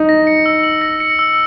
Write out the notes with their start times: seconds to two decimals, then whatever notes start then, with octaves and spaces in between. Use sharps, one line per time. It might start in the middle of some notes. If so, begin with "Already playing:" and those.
Already playing: D#4
0.09 A#6
0.27 C#7
0.46 E6
0.63 F#7
0.82 A#6
1.00 C#7
1.19 E6